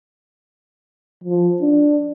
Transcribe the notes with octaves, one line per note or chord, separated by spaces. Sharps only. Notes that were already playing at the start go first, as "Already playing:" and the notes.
F3
D4